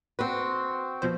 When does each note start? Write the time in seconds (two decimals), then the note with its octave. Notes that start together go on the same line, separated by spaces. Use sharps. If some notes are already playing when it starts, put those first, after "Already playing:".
0.19 C4 F#4 B4
1.02 B2 F3 C5